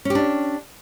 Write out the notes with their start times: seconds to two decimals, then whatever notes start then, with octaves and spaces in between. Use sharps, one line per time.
0.05 C#4
0.10 G4
0.15 D4